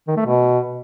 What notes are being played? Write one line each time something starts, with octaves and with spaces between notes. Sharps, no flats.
D#3
A3
B2